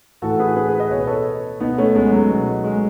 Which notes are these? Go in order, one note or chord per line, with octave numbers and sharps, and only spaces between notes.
A2 E3 F#4 A4
G#4 B4
G#4 B4
G#4 B4
B4 D#5
B2 C#5
B4
A4 C#5
B2 B3 D#4
A3 C#4
G#3 B3
F#3 A3
B2
G#3